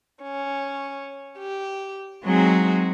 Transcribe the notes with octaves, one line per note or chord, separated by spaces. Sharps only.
C#4
G4
F#3 G#3 C4 D#4 F#4 G#4